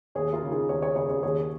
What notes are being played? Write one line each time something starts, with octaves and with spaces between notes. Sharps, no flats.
D#2 G#4 C#5
F4 A#4
C#3
D#4 G#4
D#2 G#4 C#5
G#4 C#5
C#3 G#4 C#5
G#4 C#5
D#2 G#4 C#5